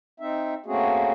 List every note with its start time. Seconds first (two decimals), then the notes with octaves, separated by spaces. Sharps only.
0.20 C4 D#4 E5
0.66 A3 A#3 C4 C#4 F#4 G#4